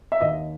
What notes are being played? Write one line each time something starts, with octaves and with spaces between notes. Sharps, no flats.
E5
D#2 D#5